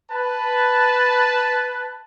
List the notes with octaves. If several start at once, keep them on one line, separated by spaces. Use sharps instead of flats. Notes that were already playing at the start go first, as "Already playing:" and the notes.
B4 A5